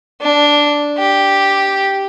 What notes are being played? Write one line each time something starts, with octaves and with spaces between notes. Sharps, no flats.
D4
G4